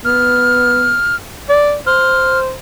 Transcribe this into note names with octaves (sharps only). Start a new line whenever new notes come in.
B3 F6
D5
C5 F6